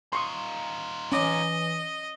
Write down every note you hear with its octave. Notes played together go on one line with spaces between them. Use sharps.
D#4 F4 C6 C#6 D#6
E3 C#4 D#5 D6